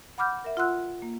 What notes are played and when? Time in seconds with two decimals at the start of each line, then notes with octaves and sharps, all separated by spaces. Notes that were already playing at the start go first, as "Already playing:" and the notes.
0.18 F#5 B5 D6 F6 G6
0.44 A#4 E5
0.57 F4 F#5 C6 E6 F#6
1.02 A#3